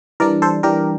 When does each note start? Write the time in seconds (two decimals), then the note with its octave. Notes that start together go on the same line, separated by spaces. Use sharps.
0.20 E3 G3 D4 A#4 D5
0.42 A4 C5
0.63 E3 G3 D4 G4 A#4